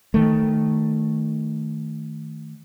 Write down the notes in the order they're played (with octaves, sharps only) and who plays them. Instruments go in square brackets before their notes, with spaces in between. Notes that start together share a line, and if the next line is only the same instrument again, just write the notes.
[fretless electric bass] D#3 A3